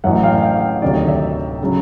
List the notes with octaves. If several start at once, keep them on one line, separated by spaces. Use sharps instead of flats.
A1 A2 F#3 E5 F#5
F5 G5
F5 G5
D2 C3 D#3 F#3 D5
D#5
D5 E5
C#3 F#3